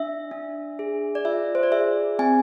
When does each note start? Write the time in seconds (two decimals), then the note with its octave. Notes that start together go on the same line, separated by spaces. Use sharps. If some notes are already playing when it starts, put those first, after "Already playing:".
Already playing: D4 E5
0.31 D4
0.79 G#4
1.15 D5
1.25 F4 E5
1.55 C5
1.63 D5
1.72 G#4 E5
2.19 C4 G#5